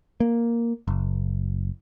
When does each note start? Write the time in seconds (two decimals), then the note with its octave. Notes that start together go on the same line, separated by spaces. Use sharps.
0.20 A#3
0.88 F#1